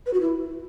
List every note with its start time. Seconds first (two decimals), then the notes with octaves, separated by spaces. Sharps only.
0.06 B4
0.13 F#4
0.21 E4